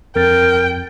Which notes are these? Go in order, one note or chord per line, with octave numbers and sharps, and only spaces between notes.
F2 A#4 G5 A6